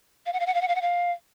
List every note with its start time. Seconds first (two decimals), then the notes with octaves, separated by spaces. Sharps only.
0.26 F5
0.33 F#5
0.40 F5
0.46 F#5
0.54 F5
0.61 F#5
0.68 F5
0.75 F#5
0.82 F5